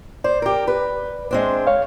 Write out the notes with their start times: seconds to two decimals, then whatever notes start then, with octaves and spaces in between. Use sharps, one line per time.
0.24 C5 D5
0.42 G4 A#4
0.67 B4
1.31 G#3 C4 D4
1.67 C#5 F5